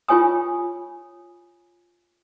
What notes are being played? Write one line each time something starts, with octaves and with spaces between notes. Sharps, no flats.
F4 G4 C#5 G#5 D#6